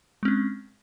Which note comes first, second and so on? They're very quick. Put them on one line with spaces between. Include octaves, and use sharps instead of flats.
G#3 C4 C#4